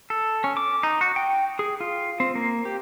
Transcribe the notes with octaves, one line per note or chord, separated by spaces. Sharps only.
A4
C#4
D6
D#4
F#4
G5
G#4
F4
C4
A#3
G4